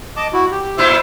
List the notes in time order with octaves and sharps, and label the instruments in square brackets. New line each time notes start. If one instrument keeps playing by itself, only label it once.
[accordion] D#5 A5 D6
E4 F#4
G4
[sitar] A#2 E4 F4 [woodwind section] C5 E5